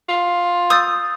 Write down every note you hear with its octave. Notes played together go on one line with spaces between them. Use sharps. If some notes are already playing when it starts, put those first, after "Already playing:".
F4
D#6 E6 G6 A6